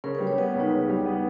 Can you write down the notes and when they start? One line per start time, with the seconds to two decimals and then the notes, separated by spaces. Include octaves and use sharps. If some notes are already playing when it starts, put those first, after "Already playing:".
0.04 C#3 A#4
0.15 B4
0.20 G3
0.27 C#5
0.38 B3 B4
0.55 C#2 D#4
0.72 C#3
0.89 G3
1.05 B3